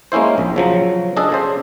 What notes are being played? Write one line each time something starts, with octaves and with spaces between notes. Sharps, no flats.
G#3 A#3 C#4 E4 C5
A#1
C#3 F3 F#3
D4 G#4 A4 D#5
C#3 C5